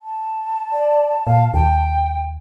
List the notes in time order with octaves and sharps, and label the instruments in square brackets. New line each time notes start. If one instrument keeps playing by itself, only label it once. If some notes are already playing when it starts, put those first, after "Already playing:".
[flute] A5
[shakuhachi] D5
[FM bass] A#2 [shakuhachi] F5
[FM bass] D#2 [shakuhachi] G5